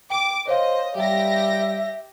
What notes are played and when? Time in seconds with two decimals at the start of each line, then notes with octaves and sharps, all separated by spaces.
0.10 G5 D6
0.47 C5 C#5 D#5 F5
0.96 G3 G4 E5 A#6